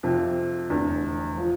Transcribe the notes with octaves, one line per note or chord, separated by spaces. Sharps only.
F2 C3 F3
F1 E2 D3
F3